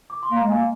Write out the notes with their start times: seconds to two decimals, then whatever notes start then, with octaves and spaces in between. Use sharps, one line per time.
0.10 D6
0.23 C6
0.31 A#3
0.36 G#3 A#5
0.49 A#3 G#5